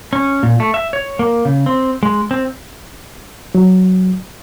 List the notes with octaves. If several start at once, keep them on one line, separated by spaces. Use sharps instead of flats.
C#4
A#2
A3
E5
C#5
A#3
C#3
C4
G#3
C4
F#3